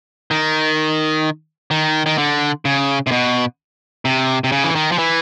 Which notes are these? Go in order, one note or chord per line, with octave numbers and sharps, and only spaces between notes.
D#3
D#3
D#3
D3
C#3
C3
B2
C3
C3
C#3
E3
D#3
F3
E3